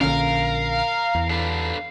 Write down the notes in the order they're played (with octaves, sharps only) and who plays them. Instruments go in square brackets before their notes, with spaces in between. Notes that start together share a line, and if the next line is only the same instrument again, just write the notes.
[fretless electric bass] A#1 D3 C#4 [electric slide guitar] A#4 [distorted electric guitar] F5
[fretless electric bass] E2
[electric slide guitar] D4 A4 B4